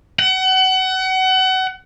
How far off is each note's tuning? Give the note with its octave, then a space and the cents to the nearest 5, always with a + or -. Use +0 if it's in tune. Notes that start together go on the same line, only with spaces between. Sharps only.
F#5 +30